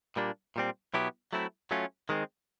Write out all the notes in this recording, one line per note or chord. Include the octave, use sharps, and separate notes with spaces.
A#2 G3 A#3 D4
A#2 G3 C4
B2 F#3 B3 E4 G4
F#3 A3 C4 E4
F#3 A3 C#4 F4
D#3 G#3 C4